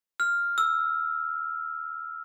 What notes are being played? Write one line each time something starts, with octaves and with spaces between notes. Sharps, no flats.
F6
E6